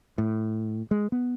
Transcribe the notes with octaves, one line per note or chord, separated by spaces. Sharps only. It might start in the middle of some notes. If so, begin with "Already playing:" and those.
A2
G#3
B3